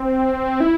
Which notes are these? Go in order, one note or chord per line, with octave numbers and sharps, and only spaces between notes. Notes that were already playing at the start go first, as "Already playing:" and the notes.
Already playing: C4
E4